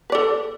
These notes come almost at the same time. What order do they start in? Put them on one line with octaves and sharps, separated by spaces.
B4 D5 A4